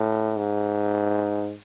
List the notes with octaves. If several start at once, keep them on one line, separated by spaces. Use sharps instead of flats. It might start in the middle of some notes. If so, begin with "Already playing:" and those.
Already playing: A2
G#2